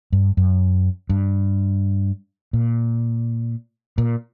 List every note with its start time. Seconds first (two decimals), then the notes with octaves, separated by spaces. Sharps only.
0.12 G2
0.37 F#2
1.09 G2
2.53 A#2
3.98 A#2